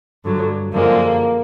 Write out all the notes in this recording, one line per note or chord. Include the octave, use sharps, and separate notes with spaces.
G2 D3 F#3
F#2 D3 F3 G#3 A#3